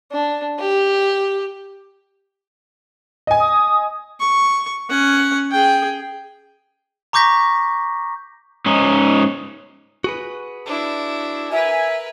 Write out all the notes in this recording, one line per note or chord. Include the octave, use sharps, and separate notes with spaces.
D4
G4
D#5 G#5
D#6
C#6
C#4 F#5
G#4 G5
A#5 C#6 D6 G6 A#6 B6
G#2 C#4 D#4
F#4 G#4 B4
D4 E4
A#4 B4 E5 G#5